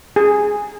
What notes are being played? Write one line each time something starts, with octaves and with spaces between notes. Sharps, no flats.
G#4